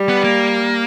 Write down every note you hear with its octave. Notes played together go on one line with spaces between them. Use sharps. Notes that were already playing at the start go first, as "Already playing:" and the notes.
Already playing: G3
B3
A#3